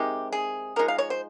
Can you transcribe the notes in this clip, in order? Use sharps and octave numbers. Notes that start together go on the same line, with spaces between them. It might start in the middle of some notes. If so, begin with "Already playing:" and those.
Already playing: C3 D#3 G#3 D#4 G4
G#4
F3 G#3 D#4 A#4
F5
C#5
C5